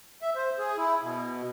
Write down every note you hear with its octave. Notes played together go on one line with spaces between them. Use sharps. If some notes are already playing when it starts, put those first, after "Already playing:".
E5
C5
G#4
E4
B2